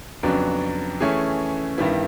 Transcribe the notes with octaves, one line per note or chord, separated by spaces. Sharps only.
F2 C#3 F#3 B3 D4
E3 A3 C#4 E4 G#4
G2 D#3 G3 B3 E4